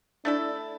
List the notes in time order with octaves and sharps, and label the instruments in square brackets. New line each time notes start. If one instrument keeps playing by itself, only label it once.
[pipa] A3 E4 A4 [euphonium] D4